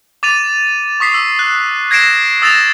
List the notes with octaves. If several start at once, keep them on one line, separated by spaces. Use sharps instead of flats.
D6 A6 D#7 F7
C#6 D#6 B6 C7
E6
F#6
G#6 A#6 C7 D7 E7
D#6 E6 A6 A#6 E7 F7